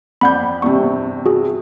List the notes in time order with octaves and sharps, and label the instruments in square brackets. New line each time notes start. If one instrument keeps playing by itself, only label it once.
[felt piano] F2 D5 G6 [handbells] F#5 B5
[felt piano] E2 G2 C3 [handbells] C#6
[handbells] F#4 G#4